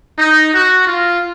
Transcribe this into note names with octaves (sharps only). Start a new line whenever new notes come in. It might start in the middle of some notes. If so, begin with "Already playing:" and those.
D#4
F#4
F4